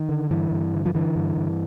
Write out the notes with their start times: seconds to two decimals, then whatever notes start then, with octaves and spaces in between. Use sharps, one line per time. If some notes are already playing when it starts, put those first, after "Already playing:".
Already playing: D#3
0.09 D3
0.30 G2 E3
0.51 G2
0.74 D3
0.86 F3
0.95 D3 E3
1.16 G2
1.37 G2